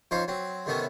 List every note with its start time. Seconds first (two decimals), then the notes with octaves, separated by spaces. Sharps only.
0.11 F2 C#4 D#4 C5 F5
0.28 F#3 C4
0.66 C3 D#3 A3 B3 C#4